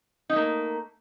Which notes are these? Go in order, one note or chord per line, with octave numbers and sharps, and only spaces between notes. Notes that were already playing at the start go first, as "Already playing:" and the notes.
A3 A#3 D#4